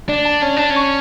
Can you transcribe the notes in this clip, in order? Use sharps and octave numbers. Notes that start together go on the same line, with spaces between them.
D4 D5
A5
C#4 A5
D4 A5
C#4
C#6